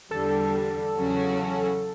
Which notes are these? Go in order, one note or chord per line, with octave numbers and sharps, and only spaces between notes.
E2 D3 G3 A4
E2 C#3 F#3 C#4 F#4